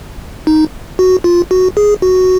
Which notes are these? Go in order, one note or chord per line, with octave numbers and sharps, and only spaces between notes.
D#4
F#4
F4
F#4
G#4
F#4